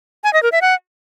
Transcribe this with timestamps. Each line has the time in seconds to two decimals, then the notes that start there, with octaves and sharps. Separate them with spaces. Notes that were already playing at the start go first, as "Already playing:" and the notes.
0.24 G#5
0.33 D#5
0.43 A#4
0.52 E5
0.61 F#5